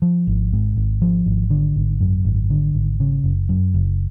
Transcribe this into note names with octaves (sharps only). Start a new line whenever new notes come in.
F3
G#1
G#2
G#1
F3
G#1
D3
G#1
F#2
G#1
D3
G#1
C#3
F#1
F#2
F#1